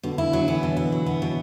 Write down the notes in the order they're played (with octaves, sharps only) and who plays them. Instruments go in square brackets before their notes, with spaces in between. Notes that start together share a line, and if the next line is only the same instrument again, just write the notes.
[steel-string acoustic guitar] B2 [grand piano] D3
[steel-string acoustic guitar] E4
F#3
[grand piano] D3
[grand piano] E3 [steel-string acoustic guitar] B3
[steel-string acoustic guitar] B2
E4
F#3
B3
B2